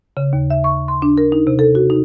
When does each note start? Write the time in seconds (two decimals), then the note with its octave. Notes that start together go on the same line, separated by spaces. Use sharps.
0.17 C#3
0.33 D#2
0.50 E5
0.64 C#6
0.88 C6
1.02 D4
1.18 A#4
1.32 D#4
1.47 C3
1.59 A4
1.75 F#4
1.90 D#4